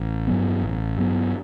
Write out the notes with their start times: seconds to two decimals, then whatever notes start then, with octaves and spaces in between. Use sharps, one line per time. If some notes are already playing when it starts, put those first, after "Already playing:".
Already playing: A1
0.27 G2 F#3 B3
0.62 A1
0.98 G2 F#3 B3